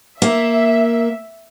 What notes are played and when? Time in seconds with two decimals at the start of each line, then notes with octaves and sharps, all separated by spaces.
0.22 A#3 E5